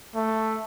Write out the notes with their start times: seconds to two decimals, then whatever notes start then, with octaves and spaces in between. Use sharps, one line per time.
0.15 A3